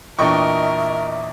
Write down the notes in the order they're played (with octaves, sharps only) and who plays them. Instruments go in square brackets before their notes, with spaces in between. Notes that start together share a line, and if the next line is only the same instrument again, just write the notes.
[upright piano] E2 A#2 D4 [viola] A#4 [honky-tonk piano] D#5 G5 C#6 [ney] E5